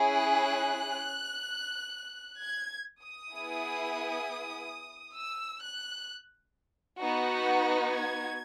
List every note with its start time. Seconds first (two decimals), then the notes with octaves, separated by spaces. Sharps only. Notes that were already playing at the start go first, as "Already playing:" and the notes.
Already playing: C#4 E4 G#4
0.12 F#6
2.41 G#6
3.02 D#6
3.33 B3 E4 G#4
5.16 E6
5.62 F#6
6.99 B3 D#4 F#4
7.91 G#6